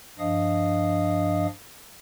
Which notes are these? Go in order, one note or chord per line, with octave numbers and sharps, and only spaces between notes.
G2 F3 D4 D#5 F5 D#6